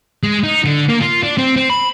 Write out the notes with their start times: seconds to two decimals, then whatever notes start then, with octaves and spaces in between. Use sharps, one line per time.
0.23 G#3
0.43 D#4
0.65 D3
0.88 A#3
1.00 F4
1.23 D4
1.38 C4
1.56 C4
1.70 B5